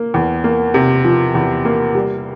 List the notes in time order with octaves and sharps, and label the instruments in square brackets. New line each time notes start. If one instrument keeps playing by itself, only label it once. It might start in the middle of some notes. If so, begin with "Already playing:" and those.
Already playing: [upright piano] A#3
E2
A#3
C3
F3
E2
A#3
G3